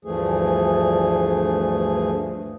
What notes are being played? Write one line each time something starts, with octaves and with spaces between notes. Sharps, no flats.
D2 G2 E3 F3 A3 G#4